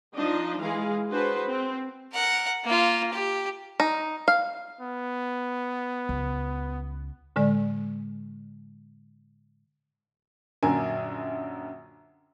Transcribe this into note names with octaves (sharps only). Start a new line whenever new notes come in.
F3 D4 D#4 D#5
E3 G#3 G#4 F5
D4 F#4 G#4 B4 C5
C4
A#4 F#5
A#3 F4
G4
D#4
F5
B3
C#2
A2 D3 G#3 D5
A#1 F#2 D3 A#4 G#5